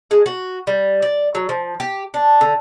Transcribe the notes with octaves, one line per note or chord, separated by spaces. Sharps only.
G#3
F#4
G3
D5
F#3
F3
G4
D4
D3